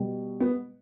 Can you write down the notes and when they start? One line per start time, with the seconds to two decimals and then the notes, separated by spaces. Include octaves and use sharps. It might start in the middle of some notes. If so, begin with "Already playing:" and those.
Already playing: B2 G3
0.40 B3